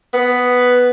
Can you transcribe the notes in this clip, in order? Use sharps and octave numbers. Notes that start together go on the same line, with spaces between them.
B3